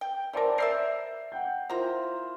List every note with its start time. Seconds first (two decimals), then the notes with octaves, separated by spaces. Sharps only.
0.01 G5
0.33 E3 A#4 C5 D5 A5
0.58 A#4 D5 E5 E6 G6 C7
1.32 F#5 G5 G6
1.70 A#3 E4 F4 C5 A#5